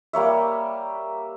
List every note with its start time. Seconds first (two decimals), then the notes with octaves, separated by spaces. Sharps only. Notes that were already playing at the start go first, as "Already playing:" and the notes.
0.13 G3 A#3 C#5 E5